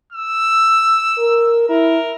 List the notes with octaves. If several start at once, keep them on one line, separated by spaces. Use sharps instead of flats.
E6
A#4
E4 A#4